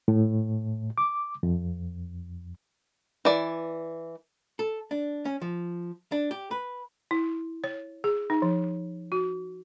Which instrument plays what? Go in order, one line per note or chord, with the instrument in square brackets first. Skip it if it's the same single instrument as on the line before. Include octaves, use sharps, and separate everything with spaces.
[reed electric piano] A2
D6
F2
[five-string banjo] E3 D5
[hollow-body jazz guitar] A4
D4
C#4
F3
D4
G4
B4
[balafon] E4
C#5
G#4
D#4
F3
F#4